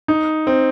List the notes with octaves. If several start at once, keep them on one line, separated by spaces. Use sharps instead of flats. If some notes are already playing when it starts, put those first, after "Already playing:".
D#4
C4